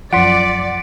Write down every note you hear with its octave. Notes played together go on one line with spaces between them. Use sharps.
F#2 F3 D5 F#5 C6 B6 C#7 D7